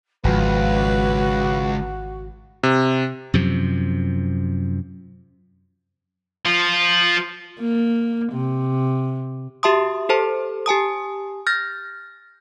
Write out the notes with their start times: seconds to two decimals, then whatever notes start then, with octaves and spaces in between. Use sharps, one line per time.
0.24 G#1 C#2 F3 F#4 B4
2.63 C3
3.34 F#2 C3 F3
6.45 F3 F4
7.60 A#3
8.33 C3
9.63 F#4 G4 E5 A5 C6 D#6
10.09 G4 A4 C5 A5
10.66 G4 G#5 A5 D#6
11.47 F6 G6 A6 A#6